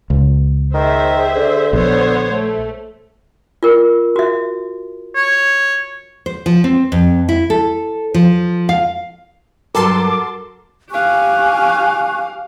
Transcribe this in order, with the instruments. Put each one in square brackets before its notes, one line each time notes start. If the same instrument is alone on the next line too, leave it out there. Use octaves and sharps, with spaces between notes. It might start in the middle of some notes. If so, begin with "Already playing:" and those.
[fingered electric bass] C#2
[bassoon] D#3 [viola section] G#4 C5 E5
[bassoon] D3
[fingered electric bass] A#1 [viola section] B3 C5 C#5
[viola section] A3
[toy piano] F4 A#4
F#4 E5
[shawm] C#5
[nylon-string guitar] C5
F3
C4
F2
E4
A4
F3
F5
[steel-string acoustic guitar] G2 F#3 [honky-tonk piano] F#4 A#4 [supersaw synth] A4 A5 C6 [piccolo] D6
[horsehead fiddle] G4 F5 [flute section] G#5 C#6 F#6